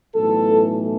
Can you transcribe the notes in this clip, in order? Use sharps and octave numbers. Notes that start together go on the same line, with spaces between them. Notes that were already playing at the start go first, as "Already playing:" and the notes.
B1 A2 E3 A4